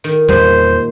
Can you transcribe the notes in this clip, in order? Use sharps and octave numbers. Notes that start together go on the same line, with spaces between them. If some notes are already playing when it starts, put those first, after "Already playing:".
D#3
E2 A#2 G3 C5 D#5